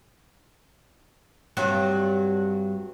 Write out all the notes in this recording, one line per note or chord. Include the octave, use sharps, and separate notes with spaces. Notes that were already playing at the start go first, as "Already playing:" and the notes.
G2 F#3 C4